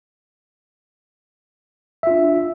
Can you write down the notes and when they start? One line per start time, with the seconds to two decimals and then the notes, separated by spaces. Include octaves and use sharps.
2.03 E5
2.07 F4
2.11 D4